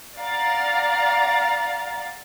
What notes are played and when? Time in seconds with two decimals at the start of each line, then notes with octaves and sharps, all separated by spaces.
0.19 D5 F5 F#5 A#5 F6 A6